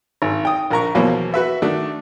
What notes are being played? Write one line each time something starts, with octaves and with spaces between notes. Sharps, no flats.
G#1
G5 D#6
A#1 A#4 A#5 C#6
E2 B2 F3 F#3 A#3 B3
F#4 B4 E5
D#3 A3 D4 F#4